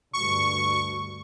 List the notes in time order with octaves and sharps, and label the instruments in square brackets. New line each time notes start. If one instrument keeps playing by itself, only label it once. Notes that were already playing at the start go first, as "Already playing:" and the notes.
[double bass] D2 G2 [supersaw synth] C#6